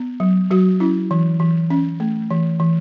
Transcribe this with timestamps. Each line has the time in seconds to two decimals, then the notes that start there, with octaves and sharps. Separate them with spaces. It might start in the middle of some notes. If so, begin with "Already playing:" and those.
Already playing: B3
0.20 F#3
0.51 F#3 F#4
0.80 C#4 E4
1.11 E3
1.40 E3
1.70 C#4
2.00 A3
2.30 E3
2.60 E3